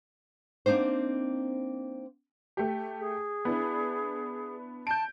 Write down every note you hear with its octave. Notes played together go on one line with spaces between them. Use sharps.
A#3 C4 D4 D#4 C5
A3 G4
G#4
B3 D4 E4
A5 G6 D7